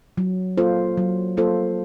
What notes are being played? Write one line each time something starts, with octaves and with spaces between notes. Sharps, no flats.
F#3
A#3 F4 A4 C5
F#3
A#3 F4 A4 C5